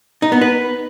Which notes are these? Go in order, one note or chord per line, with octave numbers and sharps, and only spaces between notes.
D#4
B3
B4